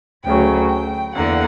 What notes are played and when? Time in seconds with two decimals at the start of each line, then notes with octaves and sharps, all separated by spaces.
0.25 D2 C#3 F#3 G5
0.70 G5
1.15 E2 D3 A#3 F#5